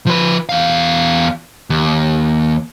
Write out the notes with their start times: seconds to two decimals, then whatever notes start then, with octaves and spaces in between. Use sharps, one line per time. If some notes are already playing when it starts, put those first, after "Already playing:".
0.07 F3 B4
0.49 E2 F5
1.70 D#2